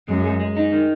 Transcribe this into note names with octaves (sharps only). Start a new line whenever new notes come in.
F#2 G#3
G#3
G#3
D#4
D#3